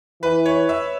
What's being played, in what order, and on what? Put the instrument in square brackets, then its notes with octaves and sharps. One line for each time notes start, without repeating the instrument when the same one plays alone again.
[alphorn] E3 [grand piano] B4
[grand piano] C#5
E5